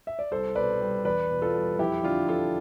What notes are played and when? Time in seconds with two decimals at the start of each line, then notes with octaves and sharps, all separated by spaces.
0.07 E5
0.19 D5
0.31 C2 A4 C5
0.55 B2 B4 D5
0.81 G3
1.05 E2 B4 D5
1.30 B2
1.42 F4 A4
1.54 G3
1.79 F2 E4 G4
2.03 D3 D4 F4
2.28 F3 F4 A4